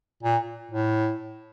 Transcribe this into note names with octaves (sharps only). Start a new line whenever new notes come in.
A#2
A2